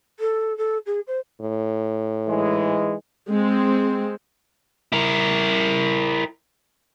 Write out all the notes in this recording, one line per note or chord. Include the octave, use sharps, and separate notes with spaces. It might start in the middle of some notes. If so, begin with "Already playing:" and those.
A4
A4
G#4
C5
A2
G#2 E3 G#3
G#3 C4
E4 A#4